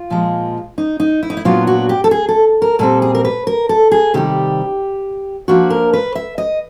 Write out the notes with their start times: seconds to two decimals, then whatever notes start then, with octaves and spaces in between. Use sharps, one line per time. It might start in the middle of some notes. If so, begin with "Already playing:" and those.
Already playing: F4
0.10 A#2 F3 G#3
0.78 D#4
1.00 D#4
1.23 E4
1.30 D#4
1.37 E4
1.45 A#2 F#3 B3 D4 F4
1.67 F#4
1.89 G4
2.04 A4
2.11 G#4
2.29 A4
2.62 A#4
2.79 A#2 G3 C4 A4
3.02 G#4
3.15 A#4
3.25 B4
3.47 A#4
3.69 A4
3.91 G#4
4.14 C3 D#3 G3 G4
5.48 F3 A#3 D4 F#4
5.70 A#4
5.93 B4
6.15 E5
6.38 D#5